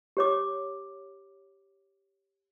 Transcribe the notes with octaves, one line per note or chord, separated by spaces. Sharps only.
G4 C#5 D6